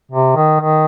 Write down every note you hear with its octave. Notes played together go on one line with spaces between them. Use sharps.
C3
D#3
D#3